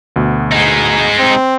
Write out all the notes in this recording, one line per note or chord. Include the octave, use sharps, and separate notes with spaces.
D2 B2
G#3 D#4
C4